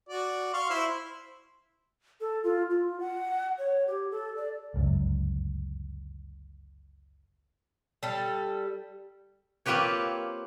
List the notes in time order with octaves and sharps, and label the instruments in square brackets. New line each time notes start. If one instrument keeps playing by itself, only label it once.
[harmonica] F#4 D5
F5 C6 C#6
E4 C5
[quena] A4
F4
F4
F#5
C#5
G4
A4
D5
[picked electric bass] G1 C#2 F#2
[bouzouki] G3 A4
[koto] A#3 C4 F4 G4 B4 C#5